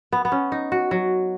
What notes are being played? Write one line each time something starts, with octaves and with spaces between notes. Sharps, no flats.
B3
B3
C#4
D#4
F#4
F#3